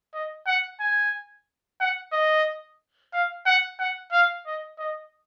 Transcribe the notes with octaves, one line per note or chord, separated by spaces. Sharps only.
D#5
F#5
G#5
F#5
D#5
F5
F#5
F#5
F5
D#5
D#5